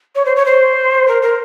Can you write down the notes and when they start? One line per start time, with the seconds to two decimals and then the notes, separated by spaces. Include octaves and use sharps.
0.15 C#5
0.25 C5
0.36 C#5
0.45 C5
1.08 A#4
1.22 A#4